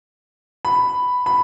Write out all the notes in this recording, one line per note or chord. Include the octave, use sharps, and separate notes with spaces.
B5
B5